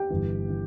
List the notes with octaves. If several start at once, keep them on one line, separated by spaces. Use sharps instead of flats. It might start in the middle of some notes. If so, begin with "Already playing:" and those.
Already playing: G4 G5
G1 G2 E3
E3